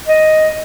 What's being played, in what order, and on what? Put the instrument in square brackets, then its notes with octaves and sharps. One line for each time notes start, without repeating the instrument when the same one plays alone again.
[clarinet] D#5